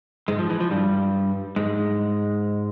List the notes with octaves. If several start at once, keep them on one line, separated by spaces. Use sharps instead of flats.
G#2 G#3
F3
E3
F3
G2 G3
G#2 G#3